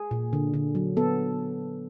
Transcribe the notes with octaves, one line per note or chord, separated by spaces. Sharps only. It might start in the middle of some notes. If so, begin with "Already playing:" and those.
Already playing: G#4
A#2
D3
D3
F#3
B3 A4